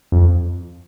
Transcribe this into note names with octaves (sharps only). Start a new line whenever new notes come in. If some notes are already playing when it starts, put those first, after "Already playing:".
F2